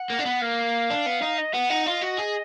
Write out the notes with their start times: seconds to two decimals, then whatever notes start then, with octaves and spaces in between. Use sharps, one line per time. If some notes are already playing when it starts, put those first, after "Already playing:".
Already playing: F#5
0.10 A#3
0.19 D4
0.25 B3
0.41 A#3 F5
0.90 D4
1.06 B3
1.22 D#4
1.38 D#5
1.53 B3 F#5
1.70 D#4 F#5
1.86 F4 D#5
2.01 F#4
2.18 G#4